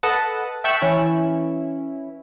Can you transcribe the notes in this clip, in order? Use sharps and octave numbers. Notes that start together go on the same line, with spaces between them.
A4 B4 D#5 F#5 A5
E5 G5 A5 C#6 E6 F#6
E3 C#4 E4